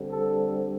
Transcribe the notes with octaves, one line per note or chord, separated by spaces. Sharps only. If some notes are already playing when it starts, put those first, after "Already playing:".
Already playing: D3 G3 C4
A4